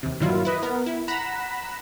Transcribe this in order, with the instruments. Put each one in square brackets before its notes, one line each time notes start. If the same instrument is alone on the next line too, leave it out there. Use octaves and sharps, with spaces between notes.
[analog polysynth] D#2 C3
G2 A#2 D#3 F#3 E4 F4
E4 B4 D#5
B3 A#4
E4
F#5 A#5 B5 B6 E7